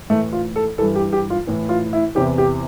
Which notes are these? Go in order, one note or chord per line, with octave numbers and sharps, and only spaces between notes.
A2 E3 A3
F4
A4
G2 E3 A4
G4
G4
F4
A2 E3
F4
E4
E2 C3 E3 G4
G4